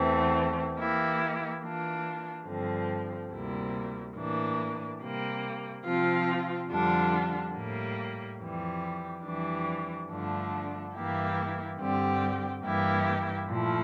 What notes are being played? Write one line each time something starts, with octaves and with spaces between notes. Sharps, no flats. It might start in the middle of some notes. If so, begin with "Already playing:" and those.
Already playing: E2 E3 A3 C4
E3 A#3 E4 G4
E3 A#3 D4 F4
G2 D3 F3 C4
D2 C3 G3 A#3 E4
A2 E3 A#3 D4
C3 G3 A#3
C3 F3 C4 F4
F2 D3 G3 D4 F4
A2 G3 A#3
F2 E3 G3
F2 E3 G3 D4
G2 D3 F3 A3 D4
G2 E3 A#3 E4 G4
G2 D3 G3 C4 G4
G2 E3 A#3 E4 G4
A#2 F3 A3 E4